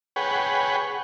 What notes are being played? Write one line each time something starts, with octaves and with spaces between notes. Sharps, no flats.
G#4 B4 C#5 F#5 G5